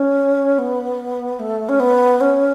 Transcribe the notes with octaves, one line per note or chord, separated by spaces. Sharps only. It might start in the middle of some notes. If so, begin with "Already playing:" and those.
Already playing: C#4
B3
A3
C#4
B3
C#4